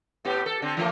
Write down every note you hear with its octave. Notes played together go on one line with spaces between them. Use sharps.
A2 B3 G4
A4
D3 C4
E3 A3 A#3